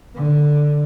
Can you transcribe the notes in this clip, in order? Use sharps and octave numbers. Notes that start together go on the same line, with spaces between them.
D3